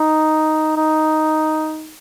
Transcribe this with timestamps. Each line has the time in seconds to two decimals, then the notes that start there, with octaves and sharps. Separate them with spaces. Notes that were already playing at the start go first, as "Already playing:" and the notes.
Already playing: D#4
0.76 D#4